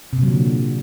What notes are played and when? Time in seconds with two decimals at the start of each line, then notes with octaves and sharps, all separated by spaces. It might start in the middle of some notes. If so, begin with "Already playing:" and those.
0.13 C3
0.18 A#2
0.23 F#3
0.28 D3